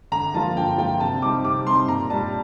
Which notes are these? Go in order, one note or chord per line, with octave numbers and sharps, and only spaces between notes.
D3 A#5
F3 A#3 F4 A5
D3 G5
F3 A#3 F4 G5
C3 A5
G3 C4 D#4 D6
C3 D6
G3 C4 D#4 C6
A#2 A#5
G3 D4 A5